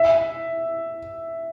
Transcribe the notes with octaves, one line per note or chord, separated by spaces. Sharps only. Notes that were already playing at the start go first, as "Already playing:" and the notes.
Already playing: E5